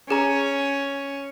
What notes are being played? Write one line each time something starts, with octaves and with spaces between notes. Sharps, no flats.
C#4 G#4 A#5